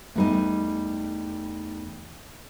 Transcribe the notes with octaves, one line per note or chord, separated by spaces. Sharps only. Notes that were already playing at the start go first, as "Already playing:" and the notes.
E2 G3 A3 D#4 D#5